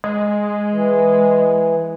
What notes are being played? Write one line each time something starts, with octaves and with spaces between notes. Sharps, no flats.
G#3
E3